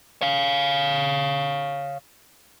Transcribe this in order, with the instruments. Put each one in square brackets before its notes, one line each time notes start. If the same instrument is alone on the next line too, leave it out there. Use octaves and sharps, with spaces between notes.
[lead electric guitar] C#5 F5